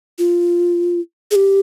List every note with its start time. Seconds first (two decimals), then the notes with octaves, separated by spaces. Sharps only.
0.19 F4
1.31 G#4
1.35 G4